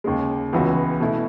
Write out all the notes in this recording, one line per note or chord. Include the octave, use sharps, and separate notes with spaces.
D#2 C#3 G#3
C#2 C#3 E3 B3 F#4
B2 A3 E4